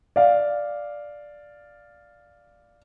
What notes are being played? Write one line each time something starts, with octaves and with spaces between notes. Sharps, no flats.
D5 F5